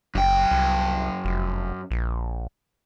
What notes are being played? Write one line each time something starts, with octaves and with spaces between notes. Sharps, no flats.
F#1 F#2 G5
C2
F1
A#1